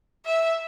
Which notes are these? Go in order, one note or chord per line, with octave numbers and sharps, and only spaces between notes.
E5